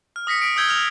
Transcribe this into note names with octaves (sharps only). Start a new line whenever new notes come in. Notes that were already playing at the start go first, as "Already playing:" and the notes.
F6
D#6 A#6 B6 C#7
B6 D7
D#6 E6 G6 G#6 G7
F6 F7